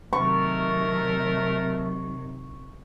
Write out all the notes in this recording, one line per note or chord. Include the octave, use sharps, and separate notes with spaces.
C3 D#3 F#3 A3 A#4 C#6